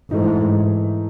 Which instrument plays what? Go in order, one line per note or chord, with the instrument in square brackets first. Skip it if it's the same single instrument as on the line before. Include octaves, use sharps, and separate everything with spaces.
[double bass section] G#2 [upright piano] E3 A3 D#4